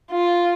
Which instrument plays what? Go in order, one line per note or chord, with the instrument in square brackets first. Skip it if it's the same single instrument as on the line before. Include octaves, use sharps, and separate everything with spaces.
[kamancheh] F4